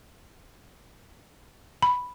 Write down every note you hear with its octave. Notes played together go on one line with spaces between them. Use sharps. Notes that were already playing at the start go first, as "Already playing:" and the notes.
B5